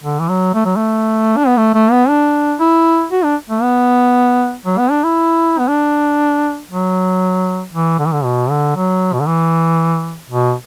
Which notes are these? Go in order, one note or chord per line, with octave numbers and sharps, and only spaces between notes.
D3
E3
F#3
A3
F#3
A3
D4
B3
A3
A3
B3
D4
E4
F#4
D4
A3
B3
F#3
B3
D4
E4
B3
D4
F#3
E3
D3
E3
D3
B2
D3
F#3
B2
D3
E3
B2